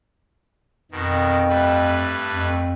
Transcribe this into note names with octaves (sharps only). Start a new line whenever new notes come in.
F2 B2 D#3
G2 A3 B4
F2